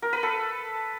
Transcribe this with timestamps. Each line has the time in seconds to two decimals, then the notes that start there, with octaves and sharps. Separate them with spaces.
0.02 A#4
0.13 B4
0.23 A4